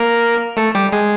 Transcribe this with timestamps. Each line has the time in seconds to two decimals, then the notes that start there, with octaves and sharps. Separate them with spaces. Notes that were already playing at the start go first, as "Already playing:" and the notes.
Already playing: A#3 A#4
0.57 A3 A4
0.75 G3 G4
0.92 G#3 G#4